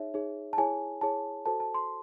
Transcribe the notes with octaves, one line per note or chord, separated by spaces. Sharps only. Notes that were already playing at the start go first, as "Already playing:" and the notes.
Already playing: D#4 G#4 C#5 E5
D#4 G#4 C#5
A5
E4 G#4 C#5 G#5
E4 G#4 C#5 A5
F#4 A4 C5 A5
A5
C6